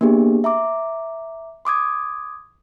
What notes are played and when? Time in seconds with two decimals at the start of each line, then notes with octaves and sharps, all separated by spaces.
0.01 A#3 B3 D4 G4 G#4
0.44 E5 A#5 D6
1.65 C6 D6 D#6 G#6